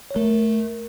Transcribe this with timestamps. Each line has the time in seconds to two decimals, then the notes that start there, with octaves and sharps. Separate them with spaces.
0.11 C#5
0.16 A3 A#4